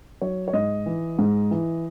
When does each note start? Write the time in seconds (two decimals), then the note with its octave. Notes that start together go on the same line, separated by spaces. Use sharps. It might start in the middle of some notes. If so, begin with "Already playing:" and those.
0.21 F#3 C#5
0.48 C#5
0.53 G#2 D#5
0.86 E3
1.19 G#2
1.51 E3